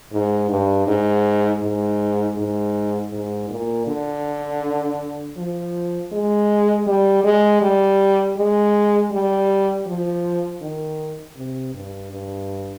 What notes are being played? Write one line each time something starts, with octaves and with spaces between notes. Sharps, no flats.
G#2
G2
G#2
G#2
G#2
G#2
A#2
D3
F3
G#3
G3
G#3
G3
G#3
G3
F3
D#3
C3
G2
G2